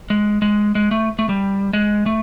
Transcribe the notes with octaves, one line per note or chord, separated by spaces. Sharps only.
G#3
G#3
G#3
A3
A3
G3
G#3
A3